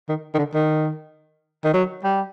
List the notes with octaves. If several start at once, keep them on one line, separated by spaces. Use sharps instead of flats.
D#3
D#3
D3
D#3
D#3
F#3
G3